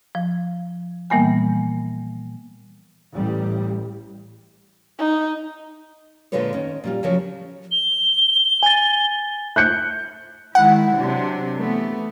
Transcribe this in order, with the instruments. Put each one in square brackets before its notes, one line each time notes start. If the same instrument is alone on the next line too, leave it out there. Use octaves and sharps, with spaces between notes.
[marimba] F3
A#2 E3 G3 A#3 B3 G#5
[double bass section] A1 G3
[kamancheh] D#4
[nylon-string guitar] A#2 D3 G#3 F4 B4 C#5
D#3 C#4
A#2 G3 F4
C#3 F3 F#3 A#4 C#5
[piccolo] G7
[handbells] G#5 A6
[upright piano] F#6 G6 C#7
[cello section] D#3 G#3 E4 [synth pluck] F#5
[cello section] C3 F#3 D4
E3 A3 B3